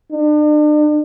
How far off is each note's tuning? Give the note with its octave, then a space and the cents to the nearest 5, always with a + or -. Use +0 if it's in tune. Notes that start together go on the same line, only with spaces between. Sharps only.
D4 +40